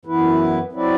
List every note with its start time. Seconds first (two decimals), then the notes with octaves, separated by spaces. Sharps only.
0.05 F#2 E3 B3 E4 B4
0.72 F#3 C4 E4 B4 D5